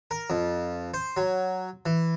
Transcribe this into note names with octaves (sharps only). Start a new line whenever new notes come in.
A#4
F2
C5
F#3
E3